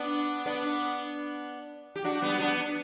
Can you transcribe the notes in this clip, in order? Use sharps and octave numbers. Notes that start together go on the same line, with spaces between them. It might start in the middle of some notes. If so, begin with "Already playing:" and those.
Already playing: B3 D4
B3 D4
G4
D4 F#4
G3 B3
B3 D4